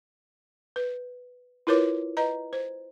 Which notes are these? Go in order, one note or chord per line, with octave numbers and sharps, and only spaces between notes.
B4
E4 F4 A#4 B4 C#5 D6
B4 D#5 A#5
C5